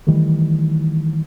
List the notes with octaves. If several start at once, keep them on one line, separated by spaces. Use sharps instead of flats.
D#3 E3 G3 A3